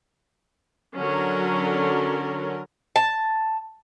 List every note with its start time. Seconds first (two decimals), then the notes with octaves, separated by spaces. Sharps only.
0.97 D3 F#3 C#4 A#4
2.96 A5